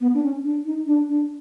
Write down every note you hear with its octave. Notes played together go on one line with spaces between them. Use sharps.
B3
D4
C#4
D4
D#4
D4
D4